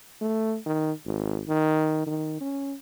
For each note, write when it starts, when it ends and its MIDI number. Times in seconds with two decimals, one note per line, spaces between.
0.21 0.57 57
0.66 0.92 51
1.05 1.42 32
1.48 2.05 51
2.06 2.37 51
2.41 2.75 61